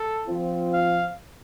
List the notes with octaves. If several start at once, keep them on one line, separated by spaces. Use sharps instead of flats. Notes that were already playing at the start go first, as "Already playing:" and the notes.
Already playing: A4
F3 C4 F4
F5